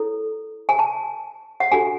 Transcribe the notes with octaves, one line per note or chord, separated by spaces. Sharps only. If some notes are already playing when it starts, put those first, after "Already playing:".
Already playing: E4 A4 C#5
G#5
A5
F#5
D4 F#4 A4 G#5